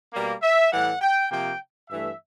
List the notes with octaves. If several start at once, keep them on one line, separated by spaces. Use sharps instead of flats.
B2 G3 A#3
E5
A2 E3 G3 F#5
G5
C3 F3 A#3 G5
G2 E3 A3 E5